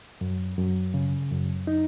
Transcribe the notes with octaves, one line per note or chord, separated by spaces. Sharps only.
F#2
F#2
C#3
F#2
D#4